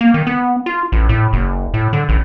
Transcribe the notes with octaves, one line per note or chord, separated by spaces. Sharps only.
A#3
D#3
B3
F4
A1
A2
F#1
A2
D3
A1